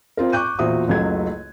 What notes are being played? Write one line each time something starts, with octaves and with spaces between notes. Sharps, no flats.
C4 F4 A#4
C#6 D6 F#6 G6 D#7
E1 A#2 F#4 C5 E5 D#6
F#1 C#2 F#3 A3 G#6